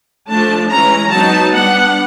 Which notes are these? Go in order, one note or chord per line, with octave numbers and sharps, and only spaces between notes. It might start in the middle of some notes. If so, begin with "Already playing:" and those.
F3 A3 D4 A5
E3 G#3 C#4 A#5
F#3 B3 D#4 A5
G3 B3 D4 F#5